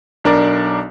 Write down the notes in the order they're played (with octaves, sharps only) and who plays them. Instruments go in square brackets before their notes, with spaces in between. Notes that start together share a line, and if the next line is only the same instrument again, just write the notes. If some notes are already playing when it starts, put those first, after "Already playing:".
[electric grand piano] B1 D4 A#4 D5